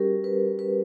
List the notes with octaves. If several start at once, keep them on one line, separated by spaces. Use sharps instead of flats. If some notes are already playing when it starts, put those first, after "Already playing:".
Already playing: G3 C#4 F#4 G4 A#4
B4
B4